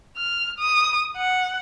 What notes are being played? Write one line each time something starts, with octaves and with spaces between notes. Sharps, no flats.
F6
D#6
F#5